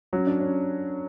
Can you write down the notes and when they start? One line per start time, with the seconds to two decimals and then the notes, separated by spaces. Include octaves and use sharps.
0.13 F#3 C#4
0.27 D4
0.40 C#4